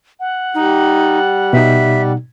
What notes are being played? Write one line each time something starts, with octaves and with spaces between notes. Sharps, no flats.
F#5
G3 D#4
B2 D#4 E5